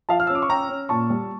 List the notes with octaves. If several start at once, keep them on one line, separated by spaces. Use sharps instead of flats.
F3 F5 A5
F6
C#4 E6
D6
C#6
C#4 G5 A#5
C#4
A#2 A5 C#6
G3